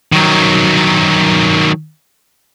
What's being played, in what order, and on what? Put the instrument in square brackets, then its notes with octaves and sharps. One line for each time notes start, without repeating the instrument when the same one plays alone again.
[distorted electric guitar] D#3 F#3